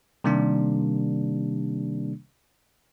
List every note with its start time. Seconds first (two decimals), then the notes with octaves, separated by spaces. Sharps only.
0.24 C3 D#3 G3 A#3 D4